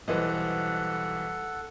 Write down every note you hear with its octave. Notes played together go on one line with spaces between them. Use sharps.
B1 E3 G3 A4 B4 C5 D#5 F#5